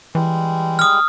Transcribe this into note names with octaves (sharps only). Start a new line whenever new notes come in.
E3 G3 G#3
D#6 F6